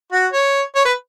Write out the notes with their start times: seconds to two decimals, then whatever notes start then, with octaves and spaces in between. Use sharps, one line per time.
0.12 F#4
0.32 C#5
0.75 C#5
0.85 B4